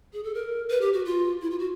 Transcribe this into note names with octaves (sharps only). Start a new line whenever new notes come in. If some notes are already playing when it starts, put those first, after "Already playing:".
G#4
A4
A#4
B4
G4
F#4
F4
E4
F4
F#4